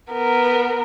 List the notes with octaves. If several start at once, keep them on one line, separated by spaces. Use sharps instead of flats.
B3 A#4